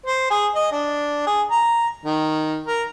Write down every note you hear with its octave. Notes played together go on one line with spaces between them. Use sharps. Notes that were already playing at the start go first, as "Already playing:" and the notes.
C5
G#4
D#5
D4
G#4
A#5
D#3
A#4